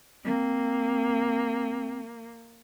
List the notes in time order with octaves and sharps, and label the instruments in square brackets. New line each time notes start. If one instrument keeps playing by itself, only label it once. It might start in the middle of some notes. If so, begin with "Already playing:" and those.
[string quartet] A#3 [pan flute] C4